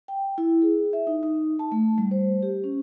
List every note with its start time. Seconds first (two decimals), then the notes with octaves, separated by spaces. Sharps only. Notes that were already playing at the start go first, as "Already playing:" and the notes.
0.08 G5
0.38 E4
0.62 G#4
0.93 E5
1.07 D#4
1.23 D#4
1.59 A5
1.72 A3
1.98 G3
2.11 C5
2.43 G4
2.64 C#4